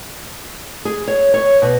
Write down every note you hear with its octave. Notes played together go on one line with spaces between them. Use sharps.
G#4
C#5
C#5
B2